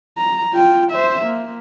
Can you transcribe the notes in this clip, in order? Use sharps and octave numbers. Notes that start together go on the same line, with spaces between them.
A#5
F4 G5
C5 E5
A#3